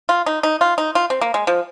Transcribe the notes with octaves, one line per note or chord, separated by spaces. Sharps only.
F4
D#4
D#4
F4
D#4
F4
C4
A#3
G#3
F3